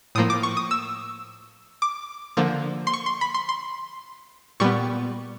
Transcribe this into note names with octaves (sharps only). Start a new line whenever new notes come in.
A2 F3 A#3 D#6
D6
C#6
D#6
E6
D6
D3 F3 A#3
C6
C#6
C6
B5
C6
C6
A#2 G3 B3 C#6